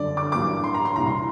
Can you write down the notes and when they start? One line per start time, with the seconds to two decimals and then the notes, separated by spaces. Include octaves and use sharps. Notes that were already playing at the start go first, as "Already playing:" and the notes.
Already playing: G1 F#2 D3 D5
0.17 D6
0.32 A1 G2 F#3 A#3 D6
0.64 C6
0.74 A#5
0.85 C6
0.96 C2 A#2 G3 A#5
1.06 C6